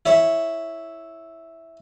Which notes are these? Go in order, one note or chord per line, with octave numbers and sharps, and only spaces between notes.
E4 C#5 E5